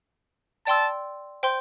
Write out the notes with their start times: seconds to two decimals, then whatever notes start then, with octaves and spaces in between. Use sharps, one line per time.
0.66 D5 G5 A5 C6 E6
1.43 C5 G5 C6 G6